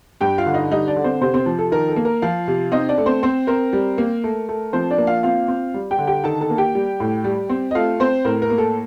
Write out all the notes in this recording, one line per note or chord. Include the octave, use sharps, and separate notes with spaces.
G2 G4 G5
F4 F5
D3
D#4 D#5
G3 D#4 D#5
D4 D5
D3
C4 C5
C3 C4 C5
C4 C5
F3
A4
D#3 A#4
A4
A#3
A#4
F3 F4 F5
C3
C4 D#4 D#5
D4 D5
A3
C4 C5
C4 C5
C4 A#4
G3
A#3
A3
A3
F3 C4 C5
D4 D5
A#3
F4 F5
C4 F4 F5
C4
G3
G4 G5
D3
G4 G5
D#3 A4 A5
A4 A5
A#3
G4 G5
G3
A2
G3
C4
D#5
A3 F4 F5
C4 C5
A2 A#4
A#4
A#3
A4